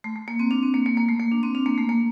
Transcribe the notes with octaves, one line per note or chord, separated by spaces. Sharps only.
A3
A3
A#3
C4
D4
C4
A#3
A#3
A#3
A3
A#3
D4
C4
D4
A#3
A3
A#3